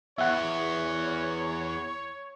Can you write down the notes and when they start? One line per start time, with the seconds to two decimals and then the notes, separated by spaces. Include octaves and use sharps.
0.18 E2 B3 C#5 E5 F#5